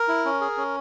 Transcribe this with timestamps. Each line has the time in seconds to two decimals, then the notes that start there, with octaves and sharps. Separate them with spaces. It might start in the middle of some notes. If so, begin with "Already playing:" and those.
Already playing: A#4
0.08 E4
0.25 C#4
0.41 G#4
0.57 C#4